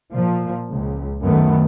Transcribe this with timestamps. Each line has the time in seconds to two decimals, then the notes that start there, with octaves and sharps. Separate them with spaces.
0.12 A#2 F3
0.70 C#2
1.24 F#2 D#3 A3 B3